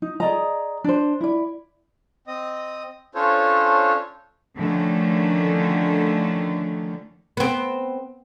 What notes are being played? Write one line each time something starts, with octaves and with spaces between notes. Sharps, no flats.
D#4
G#4 D5 D#5 A#5
D4 C5
E4 D5
C4 D#5 D#6
C#4 D4 F4 A4 C5 C#5
D3 D#3 F3 A3 C#4
B3 C4